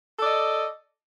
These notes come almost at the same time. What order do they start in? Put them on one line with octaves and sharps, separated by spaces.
A4 D5 D#5